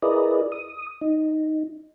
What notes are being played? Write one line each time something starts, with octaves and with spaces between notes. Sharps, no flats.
E4 G#4 A#4 B4 D5 D#5
D#6
D#4